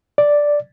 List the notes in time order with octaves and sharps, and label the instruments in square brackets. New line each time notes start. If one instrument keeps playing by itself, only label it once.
[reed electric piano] D5